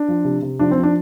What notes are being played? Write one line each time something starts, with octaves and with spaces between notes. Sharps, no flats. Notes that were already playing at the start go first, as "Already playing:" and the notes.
Already playing: D4
F3
C3
C3
F3 D4
C4
F3
D4